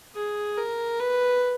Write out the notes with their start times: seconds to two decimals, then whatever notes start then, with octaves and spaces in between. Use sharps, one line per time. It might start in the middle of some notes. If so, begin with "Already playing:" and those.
0.15 G#4
0.57 A#4
1.00 B4